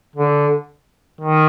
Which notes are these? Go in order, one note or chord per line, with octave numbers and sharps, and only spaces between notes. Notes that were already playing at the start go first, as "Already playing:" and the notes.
D3
D#3